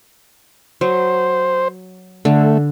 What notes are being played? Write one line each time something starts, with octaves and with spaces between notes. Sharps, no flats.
F#3 C5
D3 A3